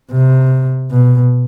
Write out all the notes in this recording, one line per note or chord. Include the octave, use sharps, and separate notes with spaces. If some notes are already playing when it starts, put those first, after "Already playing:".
C3
B2